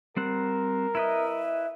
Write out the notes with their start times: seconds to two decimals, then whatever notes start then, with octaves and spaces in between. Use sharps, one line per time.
0.17 G3 C4 A#4 F#5
0.95 E4 B4 D#5 E5